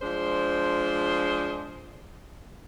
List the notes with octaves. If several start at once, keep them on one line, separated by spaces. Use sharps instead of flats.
F3 G#3 D4 C5